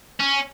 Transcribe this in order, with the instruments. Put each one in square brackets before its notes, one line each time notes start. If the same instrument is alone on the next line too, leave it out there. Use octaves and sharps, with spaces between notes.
[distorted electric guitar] C#4